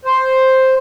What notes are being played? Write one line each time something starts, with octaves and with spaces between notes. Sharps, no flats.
C5